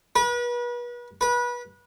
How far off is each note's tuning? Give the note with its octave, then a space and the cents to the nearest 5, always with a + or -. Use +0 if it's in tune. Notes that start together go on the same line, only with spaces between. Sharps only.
B4 -35
B4 -25